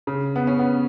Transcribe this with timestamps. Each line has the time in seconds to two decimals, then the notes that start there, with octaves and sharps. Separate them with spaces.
0.07 C#3
0.36 B3
0.47 C#4
0.59 B3